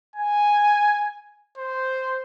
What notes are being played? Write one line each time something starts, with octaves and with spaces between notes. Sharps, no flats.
G#5
C5